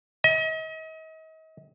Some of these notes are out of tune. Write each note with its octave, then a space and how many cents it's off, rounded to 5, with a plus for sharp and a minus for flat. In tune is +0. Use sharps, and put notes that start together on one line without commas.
D#5 +40